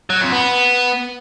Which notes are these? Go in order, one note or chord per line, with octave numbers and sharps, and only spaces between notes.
F#3
F2
B3